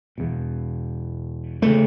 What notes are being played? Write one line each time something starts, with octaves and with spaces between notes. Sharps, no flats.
E2 B2
C#3 A3